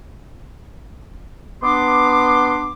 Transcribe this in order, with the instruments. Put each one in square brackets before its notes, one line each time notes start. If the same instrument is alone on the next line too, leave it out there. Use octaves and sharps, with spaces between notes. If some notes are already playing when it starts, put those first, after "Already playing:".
[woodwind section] B3 D4 C6 D6